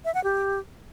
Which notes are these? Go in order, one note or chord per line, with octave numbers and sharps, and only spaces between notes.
E5
F#5
G4